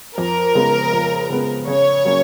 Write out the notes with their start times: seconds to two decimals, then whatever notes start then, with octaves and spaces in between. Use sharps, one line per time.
0.17 F2 A#4
0.55 C#3 G#3 B3
0.93 F2
1.30 C#3 G#3 B3
1.67 C#3 C#5
2.05 F#3 A#3 C#4